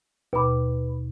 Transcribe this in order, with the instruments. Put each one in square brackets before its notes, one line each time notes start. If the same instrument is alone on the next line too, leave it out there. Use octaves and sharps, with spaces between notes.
[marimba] D#2 B2 D6 [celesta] B4 B5